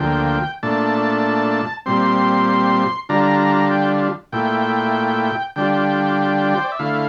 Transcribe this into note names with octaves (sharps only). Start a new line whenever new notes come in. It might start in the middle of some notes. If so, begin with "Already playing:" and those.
Already playing: D2 D3 F3 A#3 G5
A#2 A3 D4 A5
A#2 G3 C4 C6
D3 G3 D4 F4 A#5
G5
A#2 A3 E4 G5
D3 G3 D4 F4 G5
C5
D5
E5
D3 A3 E4 F5